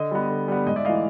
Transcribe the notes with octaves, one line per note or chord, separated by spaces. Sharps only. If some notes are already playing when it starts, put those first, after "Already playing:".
Already playing: D3 D#5
G3 B3
D3
G3 B3
G#2 D#5
D5 E5
E3 A3 D#5 F5